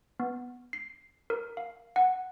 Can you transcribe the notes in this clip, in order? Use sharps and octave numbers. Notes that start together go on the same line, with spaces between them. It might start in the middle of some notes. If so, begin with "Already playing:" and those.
B3
C7
A#4
F5
F#5